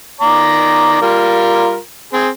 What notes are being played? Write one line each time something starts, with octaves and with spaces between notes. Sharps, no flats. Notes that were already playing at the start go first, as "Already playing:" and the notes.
D#3 D5 A#5
G3 F4 A#4
C4 G#4